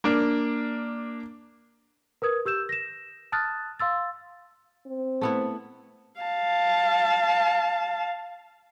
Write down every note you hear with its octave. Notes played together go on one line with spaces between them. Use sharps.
A#3 D4
A#4 B4 D#6 G#6
G4 E6 G6 E7
A#6 E7
A5 D#6 F6 F#6 A6
F5 C6 E6 A6
C4
A3 B3 E4
F5 A5